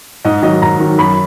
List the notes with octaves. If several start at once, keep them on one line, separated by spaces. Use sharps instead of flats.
G#2 D#5
D#3 F#3 D#5
G#2 A#5
D#3 F#3
F#2 B5